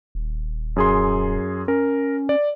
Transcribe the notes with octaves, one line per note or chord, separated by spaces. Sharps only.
D#1
F#2 G#4 C6
C#4 A#4
D5